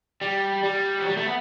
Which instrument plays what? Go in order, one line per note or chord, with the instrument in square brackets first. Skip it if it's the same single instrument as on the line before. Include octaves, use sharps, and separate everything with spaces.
[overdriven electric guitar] G3
G3
F#3
G3
A3
B3